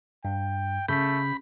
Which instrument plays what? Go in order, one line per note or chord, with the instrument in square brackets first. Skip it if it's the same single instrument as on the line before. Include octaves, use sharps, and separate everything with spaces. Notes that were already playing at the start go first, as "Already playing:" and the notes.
[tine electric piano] G2 [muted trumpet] G5
[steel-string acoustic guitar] C#3 [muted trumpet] A3 [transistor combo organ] B5 [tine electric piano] G6 B6